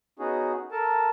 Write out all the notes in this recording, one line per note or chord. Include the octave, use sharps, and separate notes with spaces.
B3 C#4 D#4 F#4 G#4
A4 A#4 A5